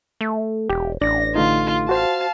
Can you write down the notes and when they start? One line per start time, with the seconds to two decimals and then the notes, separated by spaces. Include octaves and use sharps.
0.21 A3
0.70 E1 G4
1.01 A1 D4 D5 A#6
1.35 D3 A3 D#4 F4
1.89 F#4 C5 F5 A5